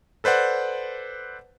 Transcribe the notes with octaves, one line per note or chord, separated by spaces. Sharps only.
A4 B4 C5 D5 F#5